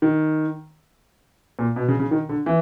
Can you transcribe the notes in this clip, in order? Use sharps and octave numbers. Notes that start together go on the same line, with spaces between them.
D#3
A#2
B2
C#3
C#3
D#3
D3
E3